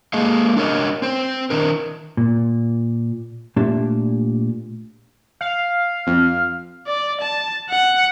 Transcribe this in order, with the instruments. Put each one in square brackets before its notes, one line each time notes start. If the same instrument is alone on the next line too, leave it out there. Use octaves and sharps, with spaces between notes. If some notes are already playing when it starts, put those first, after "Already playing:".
[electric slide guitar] G#3 A#3 G#4 D#5 F5
D4 A#4 C#5 D#5
C4 C5
D#3 D4 A#4
[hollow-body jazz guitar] A#2
A#2 A3 D4 G4 A5
[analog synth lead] F5
[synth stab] F2
[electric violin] D5
A5
F#5